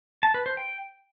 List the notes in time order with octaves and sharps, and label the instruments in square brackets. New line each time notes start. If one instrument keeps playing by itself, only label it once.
[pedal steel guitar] A5
B4
C5
G5